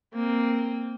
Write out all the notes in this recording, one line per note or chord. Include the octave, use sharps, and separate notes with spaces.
A#3 C4